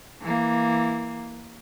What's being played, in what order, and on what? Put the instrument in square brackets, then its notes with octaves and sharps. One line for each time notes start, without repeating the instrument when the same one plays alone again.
[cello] E3 A#3